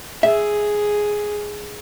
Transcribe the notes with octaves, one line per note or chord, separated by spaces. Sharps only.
G#4 E5